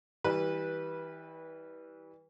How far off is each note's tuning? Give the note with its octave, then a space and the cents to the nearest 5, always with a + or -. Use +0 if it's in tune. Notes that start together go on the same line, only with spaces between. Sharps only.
E3 -30 G3 +0 B4 -20